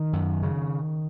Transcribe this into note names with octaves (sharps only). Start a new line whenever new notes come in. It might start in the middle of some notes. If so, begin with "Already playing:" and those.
Already playing: D#3
F#2
C#3